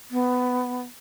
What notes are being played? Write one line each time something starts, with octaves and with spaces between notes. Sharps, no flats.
B3